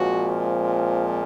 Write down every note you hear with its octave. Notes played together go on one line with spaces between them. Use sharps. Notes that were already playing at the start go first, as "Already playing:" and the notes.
Already playing: A#2 F3 G#3 C4 F#4